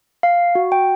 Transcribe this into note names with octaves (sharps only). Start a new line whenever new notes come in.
F5
F#4
G5